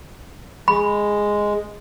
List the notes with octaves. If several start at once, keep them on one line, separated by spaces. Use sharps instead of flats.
G#3 B5